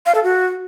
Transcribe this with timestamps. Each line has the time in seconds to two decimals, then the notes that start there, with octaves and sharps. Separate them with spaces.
0.06 F5
0.15 A4
0.24 F#4